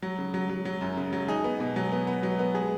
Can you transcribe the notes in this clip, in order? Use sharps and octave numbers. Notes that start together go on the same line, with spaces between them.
F#3
C#3
F#3
F#3
F#3
F#2
C#3
F#3
D#4 G#4
B3
B2
F#3
B3
B3
F#3
B3
G#3 G#4